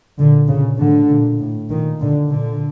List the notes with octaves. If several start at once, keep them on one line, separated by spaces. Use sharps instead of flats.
A#2 D3
A#2 C#3
A2 D3
A#2
A2
A#2 D#3
A#2 D3
A#2 D3